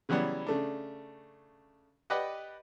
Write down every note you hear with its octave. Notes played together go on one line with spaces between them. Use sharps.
C#3 E3 F#3 G3 B3
C#3 A3 D4
G4 B4 D5 D#5 F#5